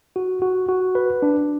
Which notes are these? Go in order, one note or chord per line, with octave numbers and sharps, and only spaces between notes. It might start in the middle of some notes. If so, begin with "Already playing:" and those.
F#4
F#4
F#4
B4
D4